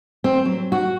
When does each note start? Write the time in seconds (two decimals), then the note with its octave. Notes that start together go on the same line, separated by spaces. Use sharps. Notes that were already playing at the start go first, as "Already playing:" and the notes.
0.24 C4
0.45 F#3
0.72 F#4